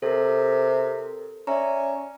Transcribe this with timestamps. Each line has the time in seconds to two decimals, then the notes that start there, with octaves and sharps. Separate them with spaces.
0.02 C3 A4 A#4
1.47 C#4 D5 E5 A#5